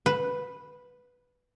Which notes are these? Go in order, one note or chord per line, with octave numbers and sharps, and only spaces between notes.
B4